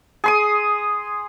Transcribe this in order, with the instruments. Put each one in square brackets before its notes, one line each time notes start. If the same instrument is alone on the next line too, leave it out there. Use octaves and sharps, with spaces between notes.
[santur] G#4 C6 D#6